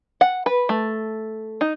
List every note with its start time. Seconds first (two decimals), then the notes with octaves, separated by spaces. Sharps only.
0.21 F#5
0.46 B4
0.69 A3
1.61 D#4